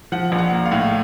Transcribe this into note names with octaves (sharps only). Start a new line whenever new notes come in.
F3 F#5
A#1
F#5
A#3
F5
A2